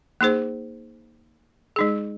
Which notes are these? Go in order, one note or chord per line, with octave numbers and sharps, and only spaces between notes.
A#3 D#4 G#4 C5
G#3 D#4 G#4